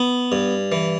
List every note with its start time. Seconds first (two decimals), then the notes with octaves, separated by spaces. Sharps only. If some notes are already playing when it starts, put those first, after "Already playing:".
Already playing: B3
0.32 G2
0.72 E3